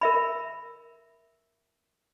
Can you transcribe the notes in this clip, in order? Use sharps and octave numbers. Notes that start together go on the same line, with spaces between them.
A#4 E5 B5